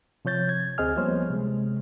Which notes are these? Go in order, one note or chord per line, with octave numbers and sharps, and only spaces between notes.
C3 F3 C#5 G6 A6
G#6
D2 C4 G#4 D#5 G#5 F6
F3 G3 A#3 B3 C5 C#5
C3 G#3